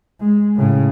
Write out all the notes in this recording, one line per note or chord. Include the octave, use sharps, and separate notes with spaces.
G#3
A2 C#3